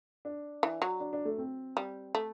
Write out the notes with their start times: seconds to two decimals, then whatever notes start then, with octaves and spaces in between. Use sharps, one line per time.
0.25 D4
0.63 E3
0.82 F#3
1.00 D4
1.13 D4
1.25 A3
1.38 C4
1.77 G3
2.15 A3